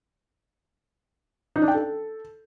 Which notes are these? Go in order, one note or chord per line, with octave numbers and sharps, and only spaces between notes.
D#4
D4
G5
A4